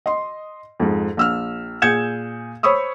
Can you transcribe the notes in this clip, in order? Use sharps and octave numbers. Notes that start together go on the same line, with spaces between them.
D#5 C6
F2 G#2
A#1 E6 F6
A#2 G#4 G6 G#6 C#7 E7
C5 C#5 B5 C#6 D#6 E6